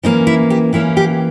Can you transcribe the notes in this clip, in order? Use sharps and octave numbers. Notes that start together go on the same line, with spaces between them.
E3 A#3 C#4 D#4
E4
G4
E3 A#3 C#4 E4
G4